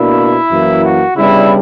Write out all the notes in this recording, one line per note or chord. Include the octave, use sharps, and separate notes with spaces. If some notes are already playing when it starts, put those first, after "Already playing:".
Already playing: B2 A#3 D4 E4
F#2 E3 A#3
F#4
C#3 G3 B3 D4 E4